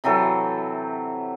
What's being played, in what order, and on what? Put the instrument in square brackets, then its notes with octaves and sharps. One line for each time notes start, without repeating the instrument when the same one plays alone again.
[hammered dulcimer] C3 E3 F#3 A4